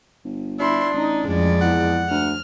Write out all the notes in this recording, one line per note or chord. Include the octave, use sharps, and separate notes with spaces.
G1
D4 E4 C6
A1 D#4
F2 G#3 D5
E2 F#5
D2 F6